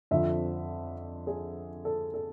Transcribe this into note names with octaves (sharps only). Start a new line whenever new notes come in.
F2 D3 F3 E5
G#4
A4
A4